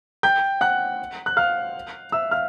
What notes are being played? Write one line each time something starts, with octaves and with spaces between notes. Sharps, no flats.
G5 G6
F#5 F#6
F#6
F5 F6
E5 E6
F5 F6